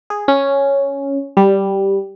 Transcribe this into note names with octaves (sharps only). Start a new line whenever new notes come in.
G#4
C#4
G3